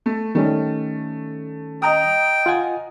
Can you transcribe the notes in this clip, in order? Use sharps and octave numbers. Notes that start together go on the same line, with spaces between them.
A3
D#3 G3 A3 C#4
D#5 G5 A#5 D#6
F4 F#5 G#5